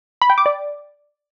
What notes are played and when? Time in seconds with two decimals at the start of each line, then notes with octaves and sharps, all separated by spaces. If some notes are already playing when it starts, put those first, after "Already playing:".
0.22 B5
0.30 G5
0.38 D6
0.46 D5